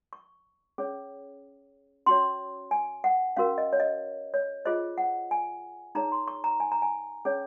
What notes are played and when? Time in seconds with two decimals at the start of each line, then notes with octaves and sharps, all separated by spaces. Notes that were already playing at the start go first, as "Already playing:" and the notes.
0.13 C#6
0.78 C#4 G#4 C#5
2.06 C#4 F#4 C#5 C6
2.71 G#5
3.04 F#5
3.37 C#4 F#4 A#4 F5
3.58 D#5
3.73 C#5
3.80 D#5
4.34 C#5
4.65 F4 G#4 C5 D#5
4.98 F#5
5.31 G#5
5.95 D#4 G#4 C#5 A#5
6.12 C6
6.28 C#6
6.44 A#5
6.60 G#5
6.72 A#5
6.82 G#5
7.25 C#4 G#4 C#5